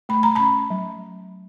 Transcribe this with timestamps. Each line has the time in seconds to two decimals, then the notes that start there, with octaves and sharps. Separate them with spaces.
0.09 A3 B5
0.23 A#5
0.35 C#4 A5 B5
0.70 F#3